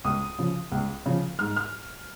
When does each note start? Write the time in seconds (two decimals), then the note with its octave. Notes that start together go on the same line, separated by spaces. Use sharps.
0.04 C#2 D#6
0.39 C#3 F3
0.72 C#2
1.06 C#3 F3
1.39 G#2 F6
1.56 F6